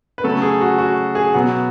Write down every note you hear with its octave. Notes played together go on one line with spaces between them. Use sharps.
B4
C#3 F#3 A3 C#4 A4
G#4
F#4
F#4
G#4
B2 F#3 B3 F#4